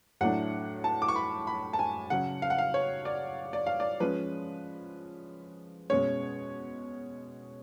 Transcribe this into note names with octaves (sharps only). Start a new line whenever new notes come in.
A2 F#3 A3 D4 F#5
A5
D6
C#6
B5
B5
A5
G#5
C#3 F#3 C#4 F#5
F5
F#5
F5
C#5
D5
D5
F5
D5
F3 G#3 C#4 B4
B2 G#3 C#4 C#5